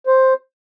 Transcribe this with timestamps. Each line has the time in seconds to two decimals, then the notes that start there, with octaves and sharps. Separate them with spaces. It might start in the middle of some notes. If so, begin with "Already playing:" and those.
0.07 C5